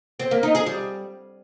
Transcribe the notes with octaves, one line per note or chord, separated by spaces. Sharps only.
C4
A#3
D#4
G#4
G3